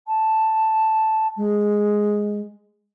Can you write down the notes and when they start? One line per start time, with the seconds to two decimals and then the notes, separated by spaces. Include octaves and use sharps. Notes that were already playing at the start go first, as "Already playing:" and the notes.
0.07 A5
1.36 G#3